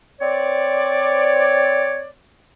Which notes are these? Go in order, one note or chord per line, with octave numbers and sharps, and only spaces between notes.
C4 C#5 D5